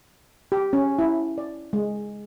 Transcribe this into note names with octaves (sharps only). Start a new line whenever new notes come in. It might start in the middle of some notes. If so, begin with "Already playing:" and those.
G4
C#4
E4
D5
G#3